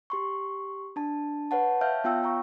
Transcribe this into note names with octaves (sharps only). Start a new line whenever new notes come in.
G4 C6 C#6
D4 A5
B4 C#5 F#5 A5
C#5 E5 F5 A5 F6 G6
B3 F4 F5 G5 E6
C#5 A#5 C#6